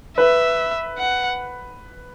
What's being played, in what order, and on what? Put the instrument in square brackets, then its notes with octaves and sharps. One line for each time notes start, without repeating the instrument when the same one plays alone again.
[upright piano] B4 [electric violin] E5
[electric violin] F#5